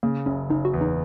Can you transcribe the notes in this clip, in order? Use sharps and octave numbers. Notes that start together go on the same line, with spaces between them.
C#3 A#3
F#1 C#4
F#1 D#4
F#4
E2
D#4